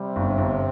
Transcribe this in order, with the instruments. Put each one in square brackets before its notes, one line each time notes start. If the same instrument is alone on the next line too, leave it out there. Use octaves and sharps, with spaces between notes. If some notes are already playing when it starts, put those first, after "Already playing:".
Already playing: [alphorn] C3 [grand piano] G3
[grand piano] G1
G1